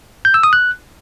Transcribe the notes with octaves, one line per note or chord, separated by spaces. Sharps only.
G6
E6
D#6
F#6